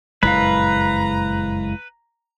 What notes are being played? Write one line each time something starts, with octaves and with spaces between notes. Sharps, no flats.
F#1 F2 A#2 G#3 E4 B4 F5 A#5